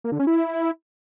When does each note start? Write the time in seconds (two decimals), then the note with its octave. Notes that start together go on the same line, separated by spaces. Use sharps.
0.04 A#3
0.12 D3
0.19 C#4
0.27 E4